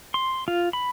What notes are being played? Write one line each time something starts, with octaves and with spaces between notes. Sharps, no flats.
C6
F4
B5